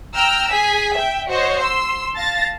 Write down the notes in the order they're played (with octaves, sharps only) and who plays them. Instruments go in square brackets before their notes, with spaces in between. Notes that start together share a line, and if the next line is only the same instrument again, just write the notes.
[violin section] G5 A#5 E6 F6
G#4 G#5 B6
E5 G5
F#4 C5 C#5 D#5
C6 E6
F5 A5 A6 A#6